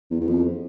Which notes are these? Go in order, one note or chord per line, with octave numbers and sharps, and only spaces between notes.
E2
E2
F2